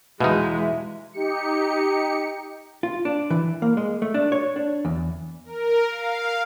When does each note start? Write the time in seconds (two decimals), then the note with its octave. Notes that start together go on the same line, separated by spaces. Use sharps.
0.20 E2 B2 G#3 D#4 E5 F5
1.13 D#4 G4 C#7
2.83 F4
3.05 D4
3.30 E3
3.62 A#3
3.77 G#3
4.02 A3
4.14 D4
4.32 C#5
4.56 D4
4.85 E2
5.45 A#4
5.90 F5